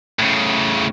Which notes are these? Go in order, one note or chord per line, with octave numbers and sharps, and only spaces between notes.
A2 C#3